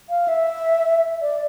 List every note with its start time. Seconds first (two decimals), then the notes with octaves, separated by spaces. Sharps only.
0.10 F5
0.28 E5
1.22 D5